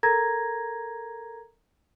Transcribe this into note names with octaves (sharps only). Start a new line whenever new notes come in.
A4 A#4 A#5 G#6 A#6